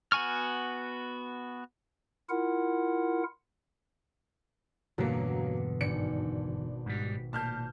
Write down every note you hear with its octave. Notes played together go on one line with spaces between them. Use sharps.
B3 F#4 G#5 C#6 F6
E4 F4 A#4 F#5
E2 G2 B2 D3 F#3 A#3
G#1 D4 C#7
G#2 G3
A#2 A5 F6 G6